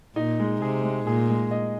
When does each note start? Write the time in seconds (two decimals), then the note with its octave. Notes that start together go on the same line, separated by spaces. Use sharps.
0.16 A#2 D#4
0.40 G#3
0.61 C3 G#4
0.83 G#3
1.06 A#2 G#4
1.29 G#3
1.51 D#5